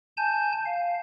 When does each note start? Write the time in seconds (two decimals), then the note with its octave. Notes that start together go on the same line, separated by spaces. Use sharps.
0.17 G#5 A5 G6
0.66 F5